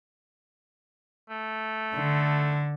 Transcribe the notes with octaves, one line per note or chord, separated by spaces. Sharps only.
A3
D3